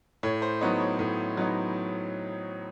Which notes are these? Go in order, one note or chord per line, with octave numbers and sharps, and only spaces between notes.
A2 C#5
C5
F#3 B3 D#4 C#5
C#5
A2
F#3 B3 D#4